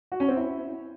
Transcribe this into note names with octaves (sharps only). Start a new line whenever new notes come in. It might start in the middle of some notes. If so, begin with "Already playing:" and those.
F#4
C#4
C4
E4